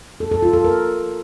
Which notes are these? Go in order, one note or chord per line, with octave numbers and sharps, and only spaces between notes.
A4
A4
F4
A4
A#4